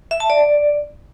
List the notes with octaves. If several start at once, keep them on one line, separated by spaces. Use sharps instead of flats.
E5
A5
D5